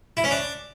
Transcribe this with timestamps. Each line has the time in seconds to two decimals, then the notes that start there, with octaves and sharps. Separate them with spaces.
0.17 E4
0.24 C#4
0.31 D4